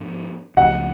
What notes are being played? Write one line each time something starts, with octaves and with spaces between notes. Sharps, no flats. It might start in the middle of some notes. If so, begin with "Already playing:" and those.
Already playing: G#2 F3 B3 D4
C#2 C#3 F3 A3 F#5